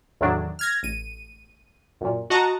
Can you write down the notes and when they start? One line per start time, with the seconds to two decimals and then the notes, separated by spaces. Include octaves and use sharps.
0.21 E2 A2 D#3 F#3 D4
0.59 F6 G#6 A#6
0.83 A1 D#7
2.01 F#2 A#2
2.30 F#4 D#5 A5 A#5